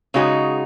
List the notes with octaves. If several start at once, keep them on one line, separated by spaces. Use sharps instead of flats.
C#3 G#3 D#4 F#4